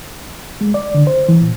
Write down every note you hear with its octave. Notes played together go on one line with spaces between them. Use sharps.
G#3
D5
D3
C5
E3
A#2